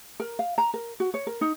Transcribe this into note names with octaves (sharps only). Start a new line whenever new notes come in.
A#4
F5
A#5
A#4
F#4
C#5
A#4
D#4